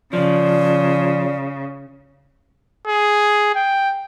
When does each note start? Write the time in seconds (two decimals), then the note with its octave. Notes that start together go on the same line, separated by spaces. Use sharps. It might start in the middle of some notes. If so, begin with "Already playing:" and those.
0.13 C#3 F3 D5
2.88 G#4
3.55 G5